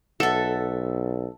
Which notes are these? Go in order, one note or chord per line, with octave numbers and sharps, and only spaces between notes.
B1 A4 E5 F#5